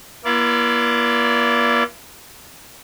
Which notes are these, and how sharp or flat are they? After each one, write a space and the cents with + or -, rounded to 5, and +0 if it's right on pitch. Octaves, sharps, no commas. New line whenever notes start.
A#3 +45 E4 +45 D5 -20